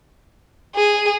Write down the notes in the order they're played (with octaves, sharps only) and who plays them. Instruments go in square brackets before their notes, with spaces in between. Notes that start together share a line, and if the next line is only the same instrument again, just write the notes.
[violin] G#4